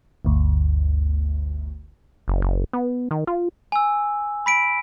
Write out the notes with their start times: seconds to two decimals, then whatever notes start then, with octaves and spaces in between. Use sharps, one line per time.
0.25 G1 D2
2.28 F#1
2.42 F#1
2.73 B3
3.11 D#3
3.27 F4
3.72 G#5 E6
4.46 B5 B6 D7